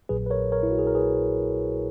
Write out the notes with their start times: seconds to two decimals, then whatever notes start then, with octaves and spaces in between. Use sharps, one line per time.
0.09 A#1 A#2 F#3 G#4 B4
0.26 B4
0.30 A#4 C#5
0.52 A#4 C#5
0.63 E4
0.71 F#4
0.79 G#4
0.87 A#4
0.95 G#4 B4